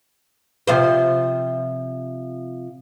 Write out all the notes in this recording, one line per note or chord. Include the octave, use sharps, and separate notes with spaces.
C3 F3 C5